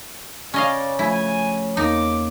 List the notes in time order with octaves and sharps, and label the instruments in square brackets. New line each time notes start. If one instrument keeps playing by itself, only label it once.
[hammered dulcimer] C#3 [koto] C#4 D#5 F5 [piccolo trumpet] D5
[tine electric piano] F3 A3 [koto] E4 [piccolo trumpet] G#5
[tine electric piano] E2 A#3 [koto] D#4 [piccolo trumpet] D6